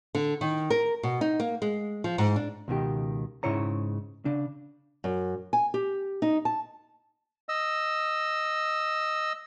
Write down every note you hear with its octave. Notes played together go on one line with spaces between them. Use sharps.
D3
D#3
A#4
B2
D#4
A#3
G#3
F3
G#2
D4
C#2 B2 D#3 G4
G#2 C#3 E4 C#5 A#5
C#3 D4
F#2
G#5
G4
D#4
A5
D#5 E6